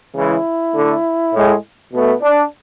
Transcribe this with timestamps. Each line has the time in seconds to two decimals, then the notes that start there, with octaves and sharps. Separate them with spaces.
0.15 C#3 E3 G#3 E4
0.75 D3 A3
1.33 A2 G#3
1.93 B2 A3 B3
2.22 D4